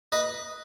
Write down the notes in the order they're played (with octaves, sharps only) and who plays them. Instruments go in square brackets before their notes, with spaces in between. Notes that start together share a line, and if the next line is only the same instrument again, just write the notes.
[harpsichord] B4 D#5